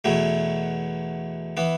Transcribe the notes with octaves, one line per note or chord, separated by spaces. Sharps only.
E2 B2 F#3 A3
E3 B3